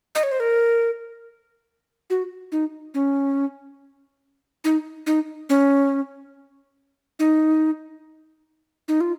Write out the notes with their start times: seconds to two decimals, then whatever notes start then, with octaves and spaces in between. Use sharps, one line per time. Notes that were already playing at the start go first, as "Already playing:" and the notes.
0.15 D#5
0.23 C#5
0.32 C5
0.40 A#4
2.10 F#4
2.52 D#4
2.94 C#4
4.64 D#4
5.07 D#4
5.49 C#4
7.19 D#4
8.88 D#4
9.01 F4